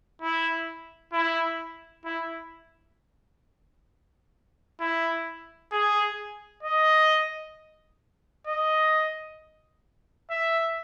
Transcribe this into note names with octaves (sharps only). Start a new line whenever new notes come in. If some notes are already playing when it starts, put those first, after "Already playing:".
E4
E4
E4
E4
G#4
D#5
D#5
E5